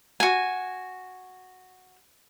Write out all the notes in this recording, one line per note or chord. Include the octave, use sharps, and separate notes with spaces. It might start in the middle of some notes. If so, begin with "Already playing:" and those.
F#4 G#5